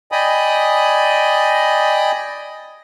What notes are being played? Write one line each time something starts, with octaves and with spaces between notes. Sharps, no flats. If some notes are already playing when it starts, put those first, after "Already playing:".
D5 D#5 G5 G#5 B5 D#6